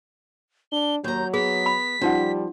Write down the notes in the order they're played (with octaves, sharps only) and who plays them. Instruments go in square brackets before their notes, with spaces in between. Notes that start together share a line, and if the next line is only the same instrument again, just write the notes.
[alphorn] D4 [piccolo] G7
[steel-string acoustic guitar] D#2 A#5 [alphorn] F#3 [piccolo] G6
[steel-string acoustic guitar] B3 [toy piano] G#4 [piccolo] B6
[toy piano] B5
[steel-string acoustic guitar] F3 [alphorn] G3 [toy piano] C#4 D#4 F#5